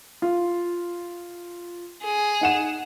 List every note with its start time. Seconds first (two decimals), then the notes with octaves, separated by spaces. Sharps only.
0.22 F4
2.03 G#4
2.41 D#4 F#5 E7